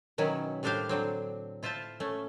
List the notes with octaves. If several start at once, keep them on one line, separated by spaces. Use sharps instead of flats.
B2 D#3 F#3 C#4 E4
A2 G3 D4 G4 C5 F5
D3 F#3 C4
E4 F4 C5 E5 A5
A3 C#4